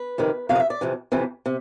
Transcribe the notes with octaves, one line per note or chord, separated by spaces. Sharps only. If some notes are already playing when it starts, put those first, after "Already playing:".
Already playing: B4
F2 C3 D#3
F2 C3 F5
D#5
E5
D5
F2 C3 E3
F2 C3 E3
C3